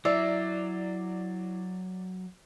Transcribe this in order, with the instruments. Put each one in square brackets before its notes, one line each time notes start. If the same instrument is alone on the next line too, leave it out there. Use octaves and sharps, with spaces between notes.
[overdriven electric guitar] F#3 [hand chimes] E4 C7 [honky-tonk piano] D5 [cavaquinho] E5